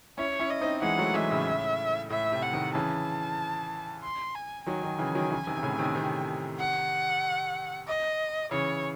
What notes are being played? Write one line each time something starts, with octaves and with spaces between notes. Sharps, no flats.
C#4 E4 C#5
C#4 E4
D#5
C4 D#4
E3 G#3 F#5
F#3 A3
E3 G#3 E5
A2 C#3
A2 E5
C3
F#5
C3 D#3
C#3 E3 A5
C6
G#5
D#3 F#3 G#5
D#3 F#3
C#3 E3
D#3 F#3
C#3 E3
C3 D#3
C3
A2 C#3
C3 D#3
C3 D#3
F#5
D#5
C#3 E3 C#5